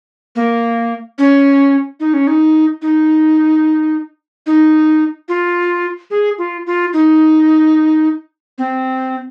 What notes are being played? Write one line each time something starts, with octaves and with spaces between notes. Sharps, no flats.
A#3
C#4
D#4
C#4
D#4
D#4
D#4
F4
G#4
F4
F4
D#4
C4